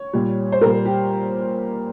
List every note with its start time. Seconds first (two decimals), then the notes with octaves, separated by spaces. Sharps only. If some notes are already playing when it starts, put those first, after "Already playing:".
Already playing: C#5
0.13 A#2 G3
0.52 C5
0.61 A#2 G3 A#4
0.85 G4